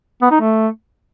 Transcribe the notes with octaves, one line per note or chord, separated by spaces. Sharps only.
B3
D#4
A3